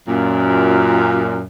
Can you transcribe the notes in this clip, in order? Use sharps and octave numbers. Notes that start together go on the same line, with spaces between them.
F#2 A#2